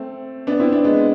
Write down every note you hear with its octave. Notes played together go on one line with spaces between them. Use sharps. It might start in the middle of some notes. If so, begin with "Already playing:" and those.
Already playing: A3 C4
B3 D4
C4 E4
B3 D4
G#3 B3